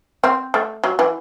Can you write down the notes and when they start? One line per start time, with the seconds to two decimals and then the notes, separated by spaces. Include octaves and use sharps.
0.24 C4
0.54 A3
0.84 F#3
0.99 E3